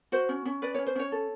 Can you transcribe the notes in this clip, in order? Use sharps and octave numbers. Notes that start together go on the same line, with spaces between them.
F#4 C5
C#4
C#4
B4 D5
C#4 C#5
C5
C#4 C#5
A4